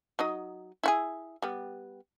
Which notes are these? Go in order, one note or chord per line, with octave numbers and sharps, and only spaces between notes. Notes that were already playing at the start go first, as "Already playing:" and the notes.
F#3 D#4 D#5
E4 F#4 G#4
G3 B3